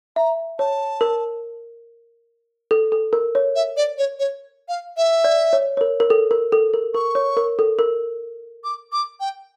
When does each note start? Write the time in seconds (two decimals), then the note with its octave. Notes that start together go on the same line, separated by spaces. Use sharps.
0.16 E5 A#5
0.59 C#5 A5
1.01 A#4
2.71 A4
2.92 A4
3.13 A#4
3.35 C#5
3.55 E5
3.77 D5
3.98 C#5
4.19 C#5
4.69 F5
4.97 E5
5.24 D5
5.53 C#5
5.77 C#5
5.81 A#4
6.00 A#4
6.10 A4
6.31 A#4
6.52 A4
6.74 A#4
6.95 A#4 C#6
7.15 C#5
7.37 A#4
7.59 A4
7.79 A#4
8.64 D6
8.92 D6
9.20 G5